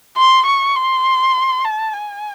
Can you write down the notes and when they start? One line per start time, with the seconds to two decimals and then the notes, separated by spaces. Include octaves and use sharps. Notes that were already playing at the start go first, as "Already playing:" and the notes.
0.17 C6
0.46 C#6
0.76 C6
1.65 A5
1.94 G#5